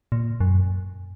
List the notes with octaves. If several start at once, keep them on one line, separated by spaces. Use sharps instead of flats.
A#2
F#2